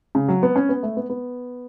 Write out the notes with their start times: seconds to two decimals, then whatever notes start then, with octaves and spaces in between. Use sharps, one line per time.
0.15 C#3
0.28 F#3
0.43 B3
0.56 C#4
0.69 B3
0.83 A3
0.97 B3
1.10 B3